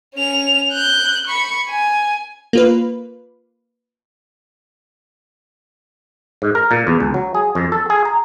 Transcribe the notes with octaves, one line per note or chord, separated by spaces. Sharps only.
C#4 F7
F#6 G6
B5 C#6
G#5
A#3 F4 B4
G#2
A#4
A#2
E2
C#2
F#3
G#4
F2
A4
G#4
A#5